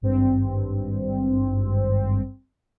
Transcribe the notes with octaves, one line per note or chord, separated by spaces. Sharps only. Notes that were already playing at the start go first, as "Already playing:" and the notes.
G#1 G2 C4